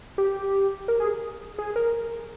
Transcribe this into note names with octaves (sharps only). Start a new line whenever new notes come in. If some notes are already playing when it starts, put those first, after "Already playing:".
G4
A#4
G#4
G#4
A#4